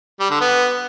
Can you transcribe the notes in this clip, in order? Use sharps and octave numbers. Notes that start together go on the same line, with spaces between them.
G3
D3
B3